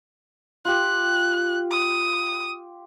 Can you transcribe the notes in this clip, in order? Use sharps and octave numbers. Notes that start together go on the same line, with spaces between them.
F4 G4 F#6
D#6